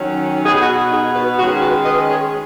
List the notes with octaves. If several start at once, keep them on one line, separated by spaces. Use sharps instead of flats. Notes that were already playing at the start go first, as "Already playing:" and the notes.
Already playing: D#3 F#3 C#4
B2 B3 D#4 G#4
F#4
D#4 G#4
F#4 B4
D#3 G#3 C#4 F#4
F#4 B4
B4 D#5
G#4 C#5